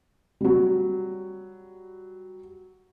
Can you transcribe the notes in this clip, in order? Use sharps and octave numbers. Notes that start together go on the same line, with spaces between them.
F#3 G3